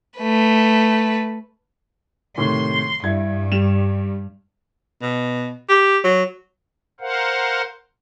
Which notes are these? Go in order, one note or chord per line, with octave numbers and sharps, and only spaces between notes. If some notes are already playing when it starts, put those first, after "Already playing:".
A3 B4
A2 C3 D#3 C6
G2 E4 G#6
G3 E7 F7
B2
G4
F#3
A#4 C5 F5 F#5